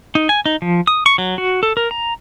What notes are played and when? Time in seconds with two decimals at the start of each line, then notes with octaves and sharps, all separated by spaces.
0.15 D#4
0.29 G#5
0.46 D#4
0.62 F3
0.87 D#6
1.06 C#6
1.18 F#3
1.38 F#4
1.63 A4
1.77 A#4
1.91 A#5